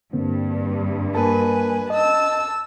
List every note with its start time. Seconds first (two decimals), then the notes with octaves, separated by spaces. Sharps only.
0.13 G2 D3 A#3 C4
1.15 A#3 A#4 B4 G#5 A5
1.90 D#5 A5 E6